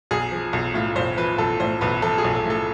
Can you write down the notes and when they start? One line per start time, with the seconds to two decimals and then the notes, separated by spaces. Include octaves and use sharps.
0.11 B1 G#4
0.32 F3
0.53 B1
0.74 A2 F4
0.96 B1 C5
1.17 F3 B4
1.38 B1 A4
1.60 A2 C5
1.81 B1 B4
2.02 F3 A4
2.18 G#4
2.24 B1
2.35 A4
2.45 A2 A4